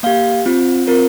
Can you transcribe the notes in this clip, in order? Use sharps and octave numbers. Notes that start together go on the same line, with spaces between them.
A#3 G4 F5
C4 F4
C4 F4 A#4